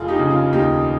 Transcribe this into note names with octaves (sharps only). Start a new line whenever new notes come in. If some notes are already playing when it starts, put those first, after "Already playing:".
Already playing: F1 F4 G#4
D#4 G4
C#3
F4
D#2 D#4 G4